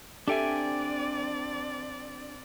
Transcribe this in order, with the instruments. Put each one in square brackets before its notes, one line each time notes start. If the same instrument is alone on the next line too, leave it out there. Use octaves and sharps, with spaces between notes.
[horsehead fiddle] C4 D5 [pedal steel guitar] D4 G5 G#5 [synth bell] G4 A4 E5